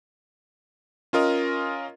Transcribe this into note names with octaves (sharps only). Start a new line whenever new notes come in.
C#4 F4 A#4 D#5